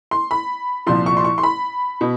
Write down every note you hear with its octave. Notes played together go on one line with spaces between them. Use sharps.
C6
B5
C2 A#2 F3 C6
C#6
C6
C#6
C6
B5
B2